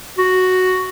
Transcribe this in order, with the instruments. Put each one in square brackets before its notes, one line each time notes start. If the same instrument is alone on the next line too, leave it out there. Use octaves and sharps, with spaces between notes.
[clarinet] F#4